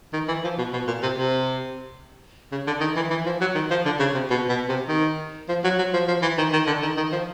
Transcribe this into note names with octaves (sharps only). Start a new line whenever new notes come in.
D#3
E3
F3
B2
B2
A#2
C3
C3
C#3
D3
D#3
E3
E3
F3
F#3
D#3
F3
D3
C#3
C3
B2
B2
C3
D#3
F3
F#3
F#3
F3
F3
E3
D#3
D#3
D3
D#3
D#3
F3